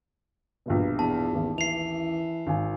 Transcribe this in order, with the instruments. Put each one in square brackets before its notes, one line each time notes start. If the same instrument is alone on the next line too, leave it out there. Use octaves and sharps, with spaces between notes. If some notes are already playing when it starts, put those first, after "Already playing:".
[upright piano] A#1 G2 B2
[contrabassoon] E2 [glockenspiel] A5
[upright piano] A1 D#2
[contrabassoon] E3 [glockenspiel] C7 F7
[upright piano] G#1 G#5